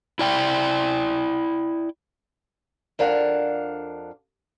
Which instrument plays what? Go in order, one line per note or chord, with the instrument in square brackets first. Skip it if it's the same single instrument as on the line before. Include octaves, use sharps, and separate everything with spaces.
[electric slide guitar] E4 D5 G5
[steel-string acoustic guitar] F2 D4 A#4 F5 F#5